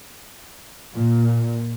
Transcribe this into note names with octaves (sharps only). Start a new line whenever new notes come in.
A#2